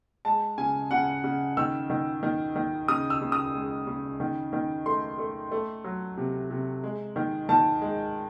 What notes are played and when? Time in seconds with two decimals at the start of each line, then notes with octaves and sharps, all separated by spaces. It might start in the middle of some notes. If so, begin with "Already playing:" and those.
0.25 G#3 A5
0.58 C#3 G#5
0.91 C#3 F#5
1.24 C#3
1.57 D#3 E6
1.90 D#3
2.23 D#3
2.56 D#3
2.88 C#3 D#6
3.10 E6
3.21 C#3
3.32 D#6
3.54 G#3
3.87 C#3
4.20 D#3
4.53 D#3
4.86 A3 C6
5.18 A3
5.51 A3
5.84 F#3
6.17 C3
6.51 C3
6.83 G#3
7.16 D#3
7.49 D#3 A5
7.82 G#3